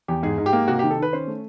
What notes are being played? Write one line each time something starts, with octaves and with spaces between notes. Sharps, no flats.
E2 G4
G#2 G#4
G#2
G4
A#3
C3 F#4
D#3 G4
A4
D#3 B4
C#4 C5
A3